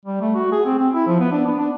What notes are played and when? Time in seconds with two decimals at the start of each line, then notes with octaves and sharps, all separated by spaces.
0.05 G3
0.21 A3
0.35 F#4
0.52 G#4
0.65 C4
0.78 C4
0.94 E4
1.07 F3
1.20 B3
1.32 D4
1.46 B3
1.58 D4